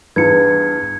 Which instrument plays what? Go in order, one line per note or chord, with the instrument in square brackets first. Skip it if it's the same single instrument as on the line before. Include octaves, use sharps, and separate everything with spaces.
[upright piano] E2 G2 [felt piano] B4 [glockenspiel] G#6 C#7